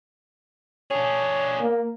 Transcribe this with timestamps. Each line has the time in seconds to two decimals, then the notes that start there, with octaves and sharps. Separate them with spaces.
0.91 D4 G#4 C#5
1.61 A#3